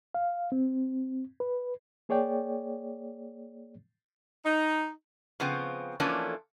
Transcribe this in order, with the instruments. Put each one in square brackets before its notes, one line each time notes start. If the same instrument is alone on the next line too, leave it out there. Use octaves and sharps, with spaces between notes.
[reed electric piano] F5
C4
B4
A#3 G#4 C#5 D5 G5
[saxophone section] D#4
[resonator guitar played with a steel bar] C#3 F3 B3 C4
E3 F3 A3 A#3 C#4 D4